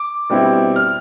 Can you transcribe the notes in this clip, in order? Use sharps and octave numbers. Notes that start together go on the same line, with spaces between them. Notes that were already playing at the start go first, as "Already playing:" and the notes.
Already playing: D6
B2 G3 C4 E4
F6